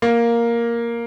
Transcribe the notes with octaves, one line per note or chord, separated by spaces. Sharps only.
A#3